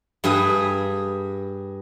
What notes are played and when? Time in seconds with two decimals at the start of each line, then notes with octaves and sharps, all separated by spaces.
0.24 G2 G#4 B4 G#5